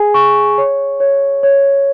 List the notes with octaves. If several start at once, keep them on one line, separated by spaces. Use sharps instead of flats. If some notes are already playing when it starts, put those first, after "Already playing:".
Already playing: G#4 G#5
C#6
C#5
C#5
C#5